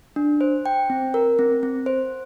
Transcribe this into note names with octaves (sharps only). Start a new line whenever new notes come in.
D4
C5
G5
C4
A#4
C4
C4
C5